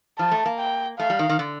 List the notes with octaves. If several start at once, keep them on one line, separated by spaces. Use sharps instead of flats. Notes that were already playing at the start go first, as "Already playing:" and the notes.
F3 A5
A3
A#3
G5
A3 F5
G3
D#3
D#3
D3